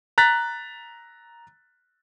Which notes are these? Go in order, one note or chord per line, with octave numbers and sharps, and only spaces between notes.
A#5 F#6 A6 B6